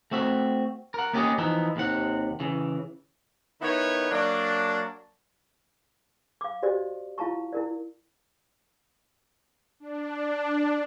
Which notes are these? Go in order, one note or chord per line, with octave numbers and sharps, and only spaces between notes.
A3 C4 F#4 E5
A#4 F#5
A#3 B3 C#4 G4 G#4 D#5
E3 F3 B3 D#4 E4
D#2 C3 F#5
C#3 E3
D#3 B3 E4 B4 C#5
F#3 A#3 D4
F5 D6
F#4 G4 C5 D5 D#5
E4 F4 F5 A5 A#5 C#6
E4 A#4 D5
D4